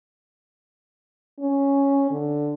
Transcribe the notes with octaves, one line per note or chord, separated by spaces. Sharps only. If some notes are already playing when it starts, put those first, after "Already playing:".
C#4
D3